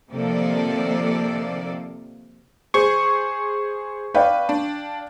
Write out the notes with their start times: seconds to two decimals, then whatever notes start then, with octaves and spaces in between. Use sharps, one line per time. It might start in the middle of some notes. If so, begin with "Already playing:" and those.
0.10 C3 D#3 F3 A#3 A4 D5
2.74 G#4 C5 C#6
4.15 B4 D5 F5 G5
4.49 D4